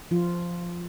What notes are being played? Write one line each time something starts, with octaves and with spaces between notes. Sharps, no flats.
F3 F4